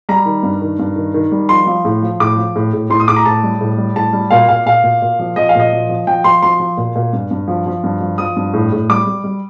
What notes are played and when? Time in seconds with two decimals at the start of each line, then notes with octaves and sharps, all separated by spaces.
0.09 G3 A#5
0.25 D#3
0.43 G2
0.62 D#3
0.79 G2
0.96 D#3
1.14 D#3
1.32 G3
1.49 F3 C6
1.66 F3
1.85 A2
2.02 F3
2.20 A2 D6
2.37 F3
2.56 A2
2.73 A2
2.90 A2 C6
3.00 D#6
3.08 A2 D6
3.17 A#5
3.26 A2 A5
3.43 G3
3.61 A2
3.78 G3
3.96 A2 A5
4.13 G3
4.31 A#2 F5
4.49 A#2 F5
4.66 A#2 F5
4.83 A#2
5.02 A#2
5.19 F3
5.36 F3 D#5
5.49 F5
5.55 A#2 D#5
5.73 F3
5.89 F3
6.07 F3 G5
6.24 F3 C6
6.42 F3 C6
6.60 F3
6.77 A#2
6.96 A#2
7.13 G2
7.31 G2
7.48 F3
7.66 F3
7.84 G2
8.01 F3
8.18 F3 D#6
8.36 G2
8.54 A2
8.72 A2
8.90 G3 D6
9.07 G3
9.24 G3